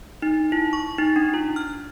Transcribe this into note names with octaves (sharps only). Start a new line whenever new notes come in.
D#4
E4
C#6
D#4
D4
F4
F6